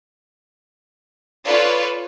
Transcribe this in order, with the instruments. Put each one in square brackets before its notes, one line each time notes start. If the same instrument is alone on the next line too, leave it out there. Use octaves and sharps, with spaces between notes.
[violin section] F4 A4 B4 C#5 D5